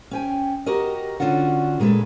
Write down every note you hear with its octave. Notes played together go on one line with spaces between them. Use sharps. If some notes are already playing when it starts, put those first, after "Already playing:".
C#4 G5 G#5
F#4 G4 A#4 D#5
D3 C#4 D4 F4 F#4
A#2 G#3 A3 A4 B4